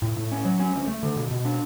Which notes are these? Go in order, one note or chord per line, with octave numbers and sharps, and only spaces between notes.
A2
A2
C#4
F#3
C#4
D2
A3
D3
B2
B2
D4